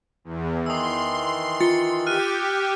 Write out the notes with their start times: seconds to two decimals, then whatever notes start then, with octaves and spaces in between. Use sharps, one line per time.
0.24 E2
0.66 D#3 E3 C6 D#6 E6
1.60 F4 A6 C#7
2.06 G4 F6 F#6 D#7